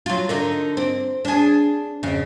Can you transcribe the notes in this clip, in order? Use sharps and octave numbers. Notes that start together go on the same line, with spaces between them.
F#3 F4
D3 D#4 A#4
C4
D4 G#4
F2 C#3